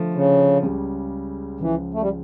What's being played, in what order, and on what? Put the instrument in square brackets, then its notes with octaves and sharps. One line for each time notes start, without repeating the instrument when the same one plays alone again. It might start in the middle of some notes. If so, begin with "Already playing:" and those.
Already playing: [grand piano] D3 F3 A3
[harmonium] C#3
[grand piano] C#2 C#3 G3
[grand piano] C#2 C#3 F3 [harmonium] E3
[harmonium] A3
G3